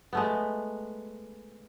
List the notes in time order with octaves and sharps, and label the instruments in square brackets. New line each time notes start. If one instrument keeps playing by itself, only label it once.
[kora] G#3 A3 B3